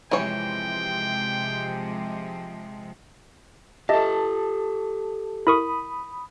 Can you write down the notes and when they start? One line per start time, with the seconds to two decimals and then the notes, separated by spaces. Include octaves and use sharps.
0.11 C3 E3 F3 G#3 C#5 G5
3.89 G4 A4 D#5 E5 A5
5.47 E4 A#4 B5 C#6 D#6